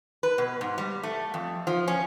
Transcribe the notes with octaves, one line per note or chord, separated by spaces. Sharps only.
B4
B2
G#2
G3
A3
F2
F3
C#4